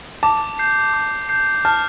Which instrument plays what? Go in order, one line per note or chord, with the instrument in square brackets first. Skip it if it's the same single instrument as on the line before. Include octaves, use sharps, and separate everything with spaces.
[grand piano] A5 [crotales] D6
[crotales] G6 C7
D6
G6 C7
[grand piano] A5 [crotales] F6